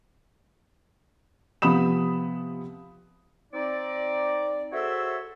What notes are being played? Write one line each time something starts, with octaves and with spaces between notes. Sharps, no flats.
C3 F3 B3 B5 D#6 E7
C4 D#4 D5
F#4 G#4 A4 C5 C#5 E5